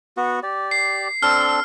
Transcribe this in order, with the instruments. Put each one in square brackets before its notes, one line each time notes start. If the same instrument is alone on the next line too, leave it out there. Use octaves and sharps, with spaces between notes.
[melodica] B3 F#4
G4 D5
[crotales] C7
[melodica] C4 D4 A4 [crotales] F6